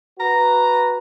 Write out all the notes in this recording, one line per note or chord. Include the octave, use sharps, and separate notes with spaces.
F#4 B4 A#5